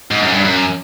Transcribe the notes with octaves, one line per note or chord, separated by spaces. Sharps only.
G#2
F#2
G2
F#2